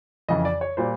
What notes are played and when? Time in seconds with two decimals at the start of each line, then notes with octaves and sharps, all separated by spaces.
0.29 F2 C#3 E3 D#5
0.45 D5
0.61 C#5
0.77 A#2 G3 C5